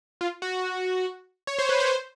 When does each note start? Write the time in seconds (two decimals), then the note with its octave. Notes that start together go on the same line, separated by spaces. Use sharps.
0.21 F4
0.42 F#4
1.47 C#5
1.59 C5
1.69 B4
1.80 C5